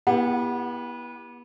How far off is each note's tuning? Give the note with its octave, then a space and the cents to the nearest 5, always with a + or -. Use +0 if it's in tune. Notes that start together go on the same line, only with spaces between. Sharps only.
B3 -30 E4 +0 G4 +20